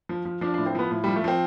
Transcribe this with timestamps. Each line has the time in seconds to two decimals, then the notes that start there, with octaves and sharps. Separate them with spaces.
0.09 F3
0.25 F3
0.41 F3 D4
0.54 D4
0.58 A2
0.66 C4
0.75 F3 B3
0.91 A2
1.04 G3
1.08 F3
1.16 A3
1.24 F3 C4